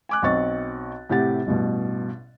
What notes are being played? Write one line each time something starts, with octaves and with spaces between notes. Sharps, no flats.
G#5 D6 F#6
B1 C4 D#5 C#6 A6
A2 C3 G4 F#5 A6
A1 G2 B2